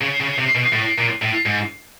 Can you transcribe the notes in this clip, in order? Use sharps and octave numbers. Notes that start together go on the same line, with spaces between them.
C#3
C#3
C3
B2
A2
A#2
A2
G#2